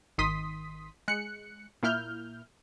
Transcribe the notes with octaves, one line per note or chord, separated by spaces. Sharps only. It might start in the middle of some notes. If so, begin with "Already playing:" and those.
G#1 D#3 C6 D#6 B6
G#3 F#6 C#7
A#2 A#3 E4 F6 G6